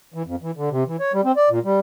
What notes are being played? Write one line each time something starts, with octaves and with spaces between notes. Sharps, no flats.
E3
F2
E3
D3
C3
E3
C#5
G3
C4
D5
A#2
G3